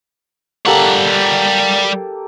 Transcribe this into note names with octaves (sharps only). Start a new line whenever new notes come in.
G3 A#3 G4 A4 F#5